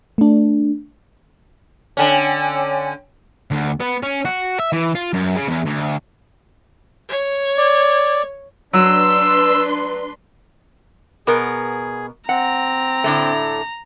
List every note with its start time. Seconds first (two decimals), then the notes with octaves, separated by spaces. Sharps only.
0.18 A3 D4
1.97 D3 C#4 C#5 G5 G#5
3.51 D2
3.80 B3
4.03 C#4
4.25 F#4
4.59 E5
4.73 E3
4.95 F4
5.13 F#2
5.35 C#3
5.48 E2
5.65 D2
7.09 C#5
7.58 D5
8.73 F#3 D4 B4 C6 E6
11.27 B2 B3 G#4 A#4
12.29 C4 F#5 A#5
13.04 A2 D3 A3